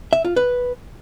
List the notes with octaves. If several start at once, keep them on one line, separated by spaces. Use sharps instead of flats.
E5
F4
B4